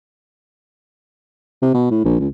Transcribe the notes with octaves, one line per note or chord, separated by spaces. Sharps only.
C3
B2
A2
A#1
C#2